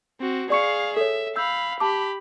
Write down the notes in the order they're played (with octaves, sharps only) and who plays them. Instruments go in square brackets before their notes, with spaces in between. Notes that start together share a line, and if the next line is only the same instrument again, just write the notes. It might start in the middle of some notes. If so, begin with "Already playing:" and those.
[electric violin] C4 F#4
[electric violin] G#4 F5 [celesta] D5 C#6 C#7
[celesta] A4 C#5 [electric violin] E5
[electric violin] F5 B5 [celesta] E6 G6
[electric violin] G4 B5 [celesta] A5 D6